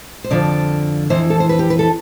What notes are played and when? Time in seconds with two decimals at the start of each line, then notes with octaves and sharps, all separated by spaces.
0.24 C5
0.31 F2 D3 F3 D5
1.10 F2 E3 C5
1.30 A4
1.40 C5
1.49 B4
1.59 G4
1.70 B4
1.79 A4